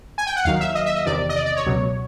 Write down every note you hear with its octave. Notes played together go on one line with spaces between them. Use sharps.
G#5
G5
F#5
D#2 D#3 F#3 F5
E5
D#5
E5
D#5
E2 C3 D#3 D5
D#5
D5
D5
C#5
C#2 B2 F#3